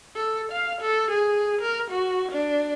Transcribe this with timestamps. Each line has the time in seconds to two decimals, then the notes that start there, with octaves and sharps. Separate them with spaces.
0.16 A4
0.52 F5
0.81 A4
1.11 G#4
1.61 A#4
1.90 F#4
2.32 D4